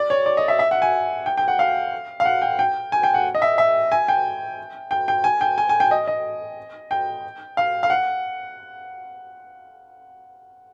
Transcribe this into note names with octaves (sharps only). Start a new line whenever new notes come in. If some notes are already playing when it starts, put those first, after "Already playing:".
Already playing: D5
C#5
D5
D#5
E5
E5
F#5
G#5
G5
G5
F#5
F5
F5
F#5
G5
G5
G#5
G5
F#5
D#5
E5
E5
G#5
G5
G5
G5
G#5
G5
G#5
G#5
G5
D#5
D#5
G5
F5
F5
F#5